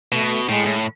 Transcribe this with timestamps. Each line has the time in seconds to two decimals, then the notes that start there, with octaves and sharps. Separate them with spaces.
0.12 B2 A3
0.49 A2 G#3
0.66 A2